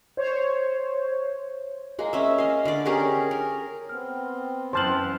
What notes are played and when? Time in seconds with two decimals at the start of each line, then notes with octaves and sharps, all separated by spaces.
0.17 C5 C#5
1.99 G#3 A#3
2.13 C#4 E5
2.38 D#5 F5
2.65 D3 D5
2.85 C#4 G4 G#4 A#4
3.31 A#4
3.89 B3 C4 F6
4.73 F#2 E3 C5 A5 C6 F6 F#7